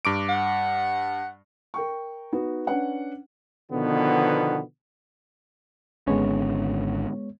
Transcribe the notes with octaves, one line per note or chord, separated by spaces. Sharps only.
G2 D6 D7
F#5
A#4 G5 C#6
B3 D#4 F#4
C#4 D4 B4 F#5
B2 D3 D#3 F3 B3
G#1 D3 G#3 B3 C#4 C#5